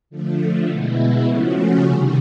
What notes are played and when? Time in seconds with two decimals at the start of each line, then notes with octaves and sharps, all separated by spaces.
0.10 D3 F3 A3
0.67 B2 G#3 B3 E4
1.25 C#3 F3 A3 C#4 F#4
1.81 C3 D#3 G3